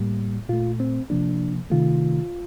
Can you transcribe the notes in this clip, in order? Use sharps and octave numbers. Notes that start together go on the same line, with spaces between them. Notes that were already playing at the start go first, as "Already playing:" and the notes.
Already playing: A2 G3 A#3
A#2 A3 F4
C4
C3 F3 A#3 D4
C3 D#3 A3 F4